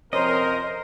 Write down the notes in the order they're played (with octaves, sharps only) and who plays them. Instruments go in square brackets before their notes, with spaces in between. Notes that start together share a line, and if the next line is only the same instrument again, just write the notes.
[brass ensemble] F2 C3 A#4 [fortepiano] C#4 [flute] C5 [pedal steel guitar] D#5